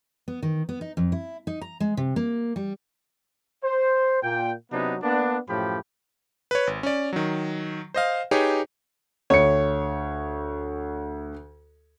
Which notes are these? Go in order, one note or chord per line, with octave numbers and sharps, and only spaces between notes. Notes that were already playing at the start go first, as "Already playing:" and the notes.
B3
D#3
B3
D#4
F2
E4
D#4
A#5
G#3
C3
A#3
G3
C5
A#2 G5
C3 F#3 B3 D4 D#4
A#3 B3 D4
F#2 A2 F3 G4 B5
B4 C#5
G#1
C#4 D5
D#3 F#3
C5 D#5 F5
D#4 G4 G#4 B4 C#5
D2 C#5 C#7